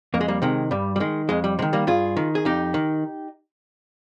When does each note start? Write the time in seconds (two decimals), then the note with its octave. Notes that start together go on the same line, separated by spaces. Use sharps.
0.14 F2 A#3
0.21 G#3
0.28 G3 A#3
0.42 C3 D#3 G#3
0.71 G2 G3
0.96 G3
1.00 D#3 G#3
1.29 F2 G#3
1.44 G3
1.59 C3 D#3 G#3
1.73 G3 A#3
1.87 G2 F4 G#4
2.17 D#3
2.35 G#4
2.45 F2 D#4 G4
2.74 D#3